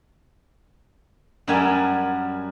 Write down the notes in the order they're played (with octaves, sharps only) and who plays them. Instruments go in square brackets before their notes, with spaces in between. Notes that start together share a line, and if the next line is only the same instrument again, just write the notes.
[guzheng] F#2 G3 F#4 A#4 G#5 A5